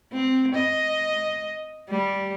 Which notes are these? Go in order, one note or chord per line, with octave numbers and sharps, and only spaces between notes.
C4
D#5
G3